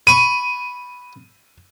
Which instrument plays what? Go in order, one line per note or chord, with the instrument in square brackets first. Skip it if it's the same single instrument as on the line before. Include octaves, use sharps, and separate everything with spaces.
[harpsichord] B5 C#6 [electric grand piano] D#7